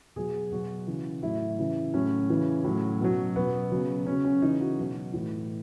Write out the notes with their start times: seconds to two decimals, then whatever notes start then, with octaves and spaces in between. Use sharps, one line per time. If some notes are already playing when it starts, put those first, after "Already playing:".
0.16 B2 F#3 G#4
0.52 B2 F#3 F#4
0.87 C#3 E3
1.23 A2 F#3 E4
1.58 C#3 E3
1.94 A2 F#3 C#4
2.30 C#3 E3
2.64 A2 F#3
3.00 B2 F#3
3.36 B2 F#3 B3
3.72 C#3 F#3
4.06 C#3 F#3 C#4
4.25 C#4
4.42 C#3 E3 D#4
4.60 F#4
4.78 B2 F#3
5.13 A2 E3